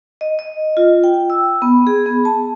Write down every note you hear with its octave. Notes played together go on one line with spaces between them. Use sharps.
D#5
D#5
F4
G5
E6
B3
G#4
B3
A5